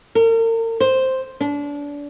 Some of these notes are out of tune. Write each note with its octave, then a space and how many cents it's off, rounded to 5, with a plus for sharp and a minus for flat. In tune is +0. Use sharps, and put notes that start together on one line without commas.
A#4 -40
C5 +0
D4 -30